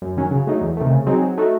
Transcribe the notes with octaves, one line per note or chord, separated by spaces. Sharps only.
F#2
D#3 F#3 C#4
C#3
F#3 A3 D#4
E2
C3 D#3 A3
C#3
F#3 C4 D#4 G#4
F#3
A3 D#4 F#4 A4